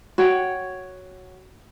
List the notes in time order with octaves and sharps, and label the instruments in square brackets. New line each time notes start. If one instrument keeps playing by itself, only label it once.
[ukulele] F#4 C#5 G5